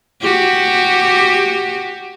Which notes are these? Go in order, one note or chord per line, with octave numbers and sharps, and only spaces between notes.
F#4 G4